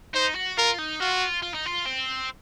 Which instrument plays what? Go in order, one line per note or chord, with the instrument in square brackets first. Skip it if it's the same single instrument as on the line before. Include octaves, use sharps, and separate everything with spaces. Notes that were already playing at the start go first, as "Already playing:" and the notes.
[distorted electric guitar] D#4 [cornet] C5
[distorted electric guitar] F#4
[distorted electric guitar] F4 [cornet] A#4
[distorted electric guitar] D#4
[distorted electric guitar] F4 [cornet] F#4
[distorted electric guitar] F4
D#4
F4
C4